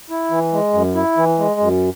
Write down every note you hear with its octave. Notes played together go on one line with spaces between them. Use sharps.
E4
E3
G#3
F#2
E4
E3
G#3
F#2